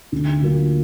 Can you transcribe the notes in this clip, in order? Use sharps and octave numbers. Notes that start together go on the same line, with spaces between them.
D2
D3 F#3 A#3 F4